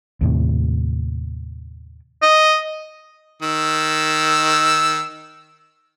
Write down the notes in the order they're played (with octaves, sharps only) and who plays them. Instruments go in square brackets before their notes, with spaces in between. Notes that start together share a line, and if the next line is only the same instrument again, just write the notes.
[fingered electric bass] D#2 A2 C3
[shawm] D#5
[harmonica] D#3 E6